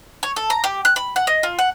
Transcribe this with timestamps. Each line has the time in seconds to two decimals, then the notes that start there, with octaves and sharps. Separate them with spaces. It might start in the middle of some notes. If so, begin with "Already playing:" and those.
0.23 C#5
0.36 A4
0.50 A#5
0.64 G4
0.85 F#6
0.96 B5
1.16 F#5
1.27 D#5
1.43 F4
1.59 F#5